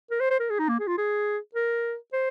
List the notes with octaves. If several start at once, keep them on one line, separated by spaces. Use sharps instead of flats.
A#4
C5
C5
A#4
G#4
D#4
A#3
G#4
F4
G#4
A#4
C5